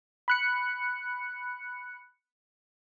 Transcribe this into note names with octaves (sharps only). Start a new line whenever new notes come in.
B5 F#6 C#7